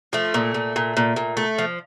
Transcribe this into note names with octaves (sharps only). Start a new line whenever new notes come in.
F3 A3
A#2
A#2
A#2
A#2
A#2
A3
F3